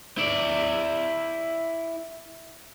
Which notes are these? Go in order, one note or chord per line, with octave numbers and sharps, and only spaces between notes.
E4 D5